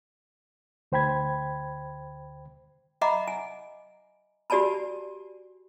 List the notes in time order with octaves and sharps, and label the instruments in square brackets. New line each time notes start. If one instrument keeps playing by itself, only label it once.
[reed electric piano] D2 C5 G5 B5 G#6
[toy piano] D#5 E5 F#5 A#5 B5 D6
G#5
F#4 G4 D5 G#5 A5 B5